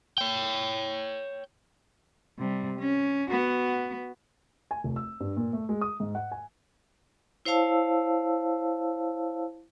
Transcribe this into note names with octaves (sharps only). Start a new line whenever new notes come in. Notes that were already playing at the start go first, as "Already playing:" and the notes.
C#5 G5
C3 G3
C#4
B3 F#4
G#5
F1
E6
G2
A#2
A3
G#3
D#6
G#2
F#5
G#5
E4 C5 C#5 F5 A5 E6